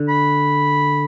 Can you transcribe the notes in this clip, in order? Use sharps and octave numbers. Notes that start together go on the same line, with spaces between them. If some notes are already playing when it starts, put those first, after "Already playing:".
Already playing: D3
B5